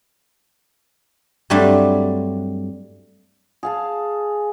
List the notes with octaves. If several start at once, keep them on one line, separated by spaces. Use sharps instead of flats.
G2 F#3 G3 A3 C4 D4
G#4 F5 A5